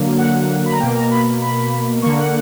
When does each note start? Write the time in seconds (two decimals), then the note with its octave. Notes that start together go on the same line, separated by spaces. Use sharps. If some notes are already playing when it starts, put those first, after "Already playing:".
Already playing: D3 F#3 A#3
0.18 F#5
0.66 B5
0.72 A#5
0.80 B2 A#3 G5
0.96 A#5
1.11 B5
1.42 B5
2.02 D3 A#3 C#6
2.17 F#5